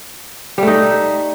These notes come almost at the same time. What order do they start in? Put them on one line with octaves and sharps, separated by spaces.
G3 A3 D#4